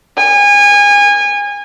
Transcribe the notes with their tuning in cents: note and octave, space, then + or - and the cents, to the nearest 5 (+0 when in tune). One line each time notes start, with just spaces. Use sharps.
G#5 -25